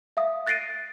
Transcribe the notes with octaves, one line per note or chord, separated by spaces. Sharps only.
E5 F5 D#6
F#6 A6 A#6 C7 D7 D#7